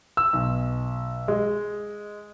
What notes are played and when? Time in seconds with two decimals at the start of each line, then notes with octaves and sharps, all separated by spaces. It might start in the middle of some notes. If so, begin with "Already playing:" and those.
0.17 E6
0.33 B1
1.28 G#3